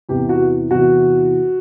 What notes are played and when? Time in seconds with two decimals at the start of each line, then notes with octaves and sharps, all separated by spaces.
0.09 E2 C3 E3 G4
0.29 F#4
0.70 E2 C3 E3 F#4